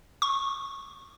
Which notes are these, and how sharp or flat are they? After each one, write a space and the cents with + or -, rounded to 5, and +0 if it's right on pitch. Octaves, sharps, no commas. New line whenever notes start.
C#6 -15